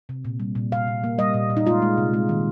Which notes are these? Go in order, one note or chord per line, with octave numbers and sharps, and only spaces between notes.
C3
A#2
G3
A#2
A#2 F5
A#2
A#3
G3 D#5
A#2
A#2
D#4
G#3 F4
G#3
C3
G#3
D#3